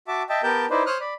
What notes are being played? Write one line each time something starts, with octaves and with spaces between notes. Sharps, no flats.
F#4 E5 A5 D6
D#5 E5 G5 A5
B3 G4 A#4 G5 A5 G6
D#4 E4 B4 C5 D5
C5 C#5 D#6 F6 F#6
D5 B5